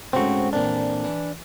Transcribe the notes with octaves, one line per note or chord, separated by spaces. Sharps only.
G#2 C#3 A3 C4 F#4
F2 A#2 E3 D4
E3